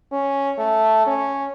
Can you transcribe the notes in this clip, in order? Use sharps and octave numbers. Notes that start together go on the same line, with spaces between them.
C#4
A3
C#4